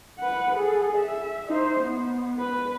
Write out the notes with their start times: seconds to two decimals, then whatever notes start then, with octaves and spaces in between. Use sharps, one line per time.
0.19 B4 F#5
0.55 G#4 A4
0.97 E5
1.48 D#4 C5
1.80 B3
2.40 B4